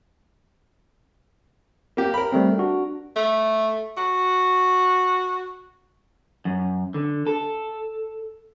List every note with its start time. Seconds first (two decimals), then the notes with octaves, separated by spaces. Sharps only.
1.97 A#3 G4
2.14 A#4 B5
2.32 G3 A3 C4
2.58 D4 F#4
3.16 A3
3.97 F#4
6.45 F#2
6.94 D3
7.27 A4